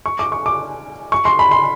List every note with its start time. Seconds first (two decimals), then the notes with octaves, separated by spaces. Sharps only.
0.06 C#6
0.19 D6
0.32 C#6
0.46 D6
1.12 C#6
1.25 C6
1.39 B5
1.51 C6